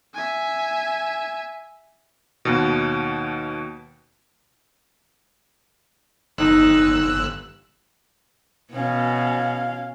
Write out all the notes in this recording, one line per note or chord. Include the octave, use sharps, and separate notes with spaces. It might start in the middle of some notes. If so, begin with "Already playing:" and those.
E5 G#5
D#2 B2
G1 D#4 E6 F#6
B2 C#4 F5